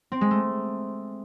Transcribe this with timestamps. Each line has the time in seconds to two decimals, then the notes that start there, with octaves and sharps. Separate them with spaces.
0.12 C4
0.21 G#3
0.31 A3